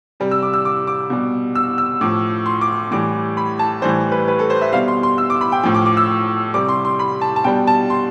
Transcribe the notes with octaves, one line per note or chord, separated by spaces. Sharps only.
C3 G3
E6
D6
E6
D6
D6
B2 G3
E6
E6
A2 F3 D6
C6
D6
A2 E3 G3 D6
B5
A5
A2 E3 G3 C5
B4
B4
A4
C5
E5
B2 G3 F5
C6
C6
E6
D6
B5
G5
A2 F3 G5
D6
D6
E6
C3 G3 D6
C6
C6
B5
A5
A5
B2 G3 G5
A5
C6